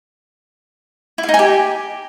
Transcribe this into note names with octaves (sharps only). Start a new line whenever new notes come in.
E4
F5
D#4
G#5
G4